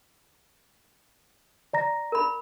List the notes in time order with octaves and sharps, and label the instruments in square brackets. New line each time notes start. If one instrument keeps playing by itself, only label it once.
[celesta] D5 A#5 A#6
[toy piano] A#4 B5